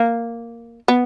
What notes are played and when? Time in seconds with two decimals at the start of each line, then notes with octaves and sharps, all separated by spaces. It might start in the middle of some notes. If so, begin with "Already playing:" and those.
Already playing: A#3
0.88 B3